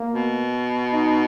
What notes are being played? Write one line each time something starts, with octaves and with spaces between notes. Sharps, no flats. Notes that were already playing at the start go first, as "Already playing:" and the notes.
Already playing: A#3
B2
D#4